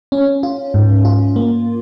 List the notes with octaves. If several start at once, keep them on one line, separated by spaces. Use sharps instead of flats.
C#4
F4
G#2
F4
A#3